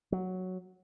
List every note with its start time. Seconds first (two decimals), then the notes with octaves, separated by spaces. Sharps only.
0.12 F#3